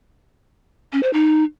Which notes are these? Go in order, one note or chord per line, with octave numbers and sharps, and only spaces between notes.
C#4
C5
D#4